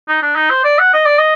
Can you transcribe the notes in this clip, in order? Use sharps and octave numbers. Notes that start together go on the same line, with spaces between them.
D#4
D4
D#4
C5
D5
F#5
D#5
D5
D#5